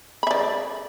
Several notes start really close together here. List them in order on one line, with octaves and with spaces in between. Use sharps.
B5 E5 D5